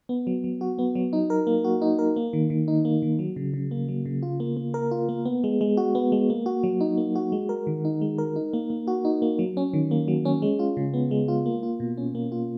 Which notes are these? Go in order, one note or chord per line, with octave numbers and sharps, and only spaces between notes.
B3
F#3
F#3
F#4
B3
F#3
D#4
A#4
A#3
F#4
D#4
A#4
A#3
D#3
D#3
D#4
A#3
D#3
F#3
C#3
C#3
A#3
F#3
C#3
F4
A#3
A#3
A#4
F4
A#3
B3
G#3
G#3
F#4
B3
G#3
A#3
F#4
F#3
D#4
A#3
F#4
G#3
A#4
D#3
D#4
G#3
A#4
D#4
A#3
A#3
F#4
D#4
A#3
F#3
C#4
D#3
A#3
F#3
C#4
G#3
F4
C#3
B3
G#3
F4
A#3
F4
B2
C#4
A#3
F4